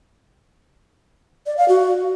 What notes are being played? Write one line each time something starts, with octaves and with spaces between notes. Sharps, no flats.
D5
F5
F#4